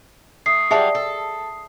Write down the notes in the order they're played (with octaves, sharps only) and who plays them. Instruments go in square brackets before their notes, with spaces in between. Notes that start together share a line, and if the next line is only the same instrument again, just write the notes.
[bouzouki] A3 [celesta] D#6 C7
[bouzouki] F#3 G3 F4 [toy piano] G#4 E5 A5
[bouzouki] A4